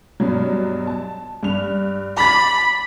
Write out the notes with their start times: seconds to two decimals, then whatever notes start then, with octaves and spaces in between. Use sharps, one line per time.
0.20 G2 B2 F#3
0.87 A5
1.43 G2 F7
2.17 B5 D6 A6